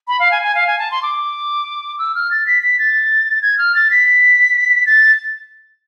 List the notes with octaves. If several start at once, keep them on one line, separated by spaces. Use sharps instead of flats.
B5
F5
G#5
G#5
F5
G#5
A5
C6
D6
E6
F6
A6
B6
B6
A6
G#6
F6
A6
B6
A6